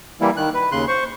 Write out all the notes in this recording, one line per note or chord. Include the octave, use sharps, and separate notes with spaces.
E3 G3 A#3 E4
D#3 F#6
B4
D#2 C#3 C6 F#6
C5 C#6